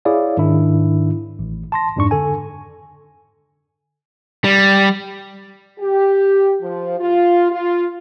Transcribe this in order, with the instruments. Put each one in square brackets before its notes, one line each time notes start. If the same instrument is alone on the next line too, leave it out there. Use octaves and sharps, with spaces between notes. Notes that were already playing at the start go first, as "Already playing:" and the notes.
[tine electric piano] E4 G#4 C#5 D5 F5
G#2 D#3 D4 E4
A1
A5 C6 A#6
F2 G#2 D4 C#6
D3 A4 G#5
[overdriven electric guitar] G3
[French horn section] G4
F3
F4
F4